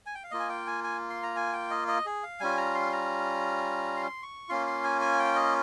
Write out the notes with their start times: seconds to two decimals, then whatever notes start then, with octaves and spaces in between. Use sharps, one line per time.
0.06 G#5
0.15 G5
0.24 F5
0.31 A#3 F4 D#5
0.40 G#5
0.49 G5
0.67 G#5
0.84 G#5
1.10 C6
1.23 A#5
1.36 G#5
1.53 G5
1.71 D#5
1.88 D#5
2.06 G#4
2.23 F5
2.40 G3 C#4 F4 G#5
2.57 A#5
2.75 C6
2.92 A#5
3.97 C6
4.23 C#6
4.49 A#3 C#4 F4 C6
4.66 C6
4.84 G#5
5.01 G#5
5.19 G5
5.36 D#5